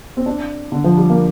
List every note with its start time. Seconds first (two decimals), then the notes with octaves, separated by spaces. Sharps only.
0.17 C4
0.26 D4
0.72 D3
0.84 F3
0.97 G3
1.10 A#3